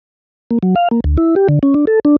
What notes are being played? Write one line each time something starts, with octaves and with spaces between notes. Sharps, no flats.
A#3
F#3
F5
A#3
D2
E4
G4
D3
C#4
D4
A4
D4